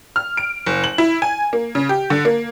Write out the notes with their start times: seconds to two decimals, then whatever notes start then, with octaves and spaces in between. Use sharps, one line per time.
0.16 F6
0.37 D7
0.66 F#1
0.84 F#7
0.98 E4
1.22 G#5
1.53 A#3
1.75 C#3
1.89 G4
2.10 D3
2.25 A#3